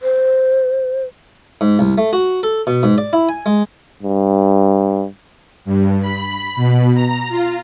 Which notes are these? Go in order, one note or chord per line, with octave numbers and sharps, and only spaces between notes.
C5
G#2
C2
A3
F#4
A4
B2
G#2
D5
E4
G#5
G#3
G2
G2
B5
B2
A#5
F4